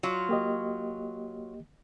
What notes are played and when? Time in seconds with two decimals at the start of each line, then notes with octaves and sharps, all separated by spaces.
0.03 F#3 F4
0.29 A#3 G4 D#5